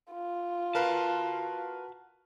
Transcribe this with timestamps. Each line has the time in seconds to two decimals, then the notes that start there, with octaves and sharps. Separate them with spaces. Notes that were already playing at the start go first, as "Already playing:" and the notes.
0.12 F4
0.75 F#4 A#4 B4 F5 A5